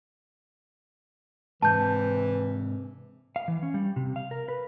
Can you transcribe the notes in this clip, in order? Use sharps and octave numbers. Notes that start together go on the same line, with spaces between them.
G#2 C3 E3 A5 G6
F5
E3
C#4
G3
C3
F5
A#4
B4